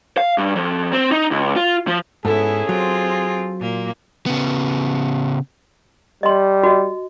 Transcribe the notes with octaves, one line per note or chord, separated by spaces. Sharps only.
F5
G2
F2
C4
D#4
C#2
F4
F3
G#2 B3 C#4 E4 G#4 A4
F#3 C4 F4
A#2 A#3
C#3 B3
G3 D#5 C6
F#4 D#5